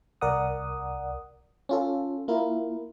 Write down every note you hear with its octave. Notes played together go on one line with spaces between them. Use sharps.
C2 A#4 D5 F#5 D#6
C#4 F4 A4
A#3 E4 F4 A#4